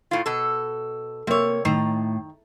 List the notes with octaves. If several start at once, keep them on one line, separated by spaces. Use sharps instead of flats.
A2 F4
B2 A4
C3 A#3 C#5
A2 D#3 A#5